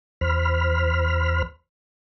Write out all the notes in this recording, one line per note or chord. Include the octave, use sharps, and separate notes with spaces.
E2 C5 B5 F6